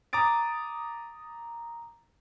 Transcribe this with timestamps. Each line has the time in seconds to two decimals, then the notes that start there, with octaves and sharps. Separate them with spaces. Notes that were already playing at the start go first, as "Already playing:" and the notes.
0.13 A#5 D6 D#6 A6 D7